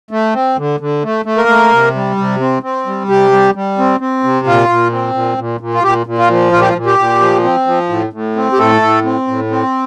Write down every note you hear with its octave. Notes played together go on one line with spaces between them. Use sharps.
A3
C4
D3
D3
A3
A3
A#3 A#4
A3
C3
G3
C3
C4
C4
G3
C3 G4
G3
G3
C4
C4
C3
A#2 F4
A#2
C4
A#2
A#2
A#2
F4
A#2 G4
A#2
F4
F3
A#2 F4
G4
F4
A#2
G4
A#2
F3
C4
F3
A2
A2
C4
G4
A2 A3 A4
A2
C4
A2
C4